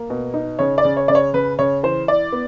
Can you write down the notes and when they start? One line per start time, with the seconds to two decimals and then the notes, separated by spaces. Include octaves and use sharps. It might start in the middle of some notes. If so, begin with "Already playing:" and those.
Already playing: A#3
0.10 B2
0.34 D#4
0.59 C#3 C#5
0.78 D5
0.84 C#3
0.97 C#5
1.08 C#3 D5
1.15 C#5
1.34 C#3 B4
1.59 C#3 C#5
1.83 E3 C5
2.08 E4 D5
2.32 B3